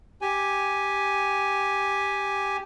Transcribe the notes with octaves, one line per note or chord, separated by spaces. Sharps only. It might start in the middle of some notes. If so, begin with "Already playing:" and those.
G4 G#5